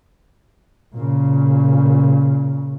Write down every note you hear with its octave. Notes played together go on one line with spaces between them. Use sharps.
A#2 C#3